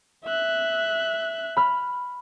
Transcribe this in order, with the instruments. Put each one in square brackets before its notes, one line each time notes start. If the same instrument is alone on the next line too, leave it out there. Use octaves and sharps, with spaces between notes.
[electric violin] E5 F#6
[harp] B5 F6